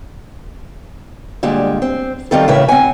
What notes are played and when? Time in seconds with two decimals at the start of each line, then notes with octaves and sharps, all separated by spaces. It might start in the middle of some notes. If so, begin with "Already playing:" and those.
1.43 A#2 D3 G3 G#3
1.82 C4
2.31 D#3 G3 C4 F4 A4
2.48 A2 C#3 E3 A#4 E5
2.68 C4 F#5 G#5